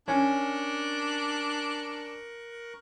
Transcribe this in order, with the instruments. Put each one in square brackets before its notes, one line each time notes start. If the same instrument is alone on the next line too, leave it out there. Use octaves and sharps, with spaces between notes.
[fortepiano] C#4 [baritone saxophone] D4 [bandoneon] A#4 C#6 F#6